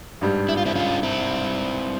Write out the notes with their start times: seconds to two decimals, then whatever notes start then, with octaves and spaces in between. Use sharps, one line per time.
0.21 G#1 G2 G3
0.49 E4
0.57 F4
0.66 C4 E4
0.75 C#4 F4
1.03 C4 E4